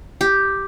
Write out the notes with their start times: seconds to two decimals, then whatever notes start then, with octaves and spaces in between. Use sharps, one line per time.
0.21 G4